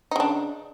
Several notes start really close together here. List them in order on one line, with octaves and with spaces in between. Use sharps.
D#4 C#3 D4